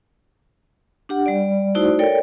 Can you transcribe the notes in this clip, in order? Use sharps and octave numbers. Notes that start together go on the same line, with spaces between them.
D4 G4 F#5
G3 D5
A3 D#4 E4 F#4 C5 D5
A4 A#4 C#5 D5 G5